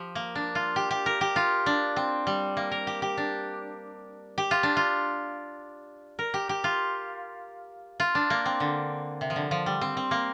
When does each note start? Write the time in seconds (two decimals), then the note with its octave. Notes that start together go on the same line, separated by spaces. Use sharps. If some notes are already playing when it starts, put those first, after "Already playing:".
Already playing: F3 G4
0.15 A#3
0.35 D4
0.55 F4
0.76 G4
0.91 G4
1.06 A#4
1.21 G4
1.36 F4
1.66 D4
1.96 C4
2.27 G3
2.57 A#3
2.72 A#4
2.87 G4
3.02 G4
3.17 D4
4.38 G4
4.51 F4
4.63 D4
4.77 F4
6.19 A#4
6.34 G4
6.49 G4
6.64 F4
8.00 F4
8.15 D4
8.30 A#3
8.46 C4
8.60 D3
9.21 C3
9.30 F3
9.36 D3
9.51 F3
9.66 G3
9.81 C4
9.97 C4
10.11 A#3